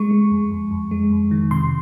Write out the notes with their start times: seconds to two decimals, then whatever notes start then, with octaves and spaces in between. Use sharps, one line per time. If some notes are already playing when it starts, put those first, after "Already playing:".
Already playing: G#3 C#6
0.11 G#3
0.31 F2
0.51 F2
0.71 F2
0.91 G#3
1.11 F2
1.31 D#3
1.51 C3 C6